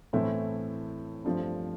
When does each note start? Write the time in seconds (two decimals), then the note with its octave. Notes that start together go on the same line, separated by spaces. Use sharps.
0.13 A2 E3 A3 C4 E4
1.25 G2 F3 A3 C4